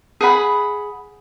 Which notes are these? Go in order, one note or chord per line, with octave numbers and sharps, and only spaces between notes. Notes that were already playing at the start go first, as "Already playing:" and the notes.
G#4 F#5 B5